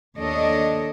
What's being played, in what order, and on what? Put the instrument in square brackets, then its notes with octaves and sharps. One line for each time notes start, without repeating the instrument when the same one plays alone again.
[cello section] D#2 D4 A4 C#5 D#5